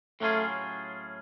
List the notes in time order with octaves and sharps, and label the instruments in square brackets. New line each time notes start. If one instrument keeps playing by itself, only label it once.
[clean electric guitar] A2 F#3 C#4 F4 G#4 [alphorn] A3